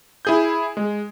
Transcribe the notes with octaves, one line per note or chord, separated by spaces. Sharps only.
E4 G#4 G6
G#3